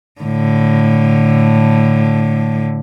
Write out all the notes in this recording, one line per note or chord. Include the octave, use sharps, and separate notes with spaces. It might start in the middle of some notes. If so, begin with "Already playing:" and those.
A2 D3